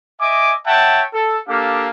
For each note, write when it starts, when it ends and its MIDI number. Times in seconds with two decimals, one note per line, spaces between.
0.21 0.53 75
0.21 0.53 76
0.21 0.53 80
0.21 0.53 86
0.66 1.02 73
0.66 1.02 76
0.66 1.02 78
0.66 1.02 79
0.66 1.02 81
1.14 1.37 69
1.48 1.90 58
1.48 1.90 62
1.48 1.90 67
1.48 1.90 69
1.48 1.90 77